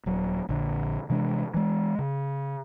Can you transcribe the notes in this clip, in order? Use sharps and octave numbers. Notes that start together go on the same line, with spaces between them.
D#1 F#3
A#1 D3
C3 E3 G#3 D4
E3 G#3
C#3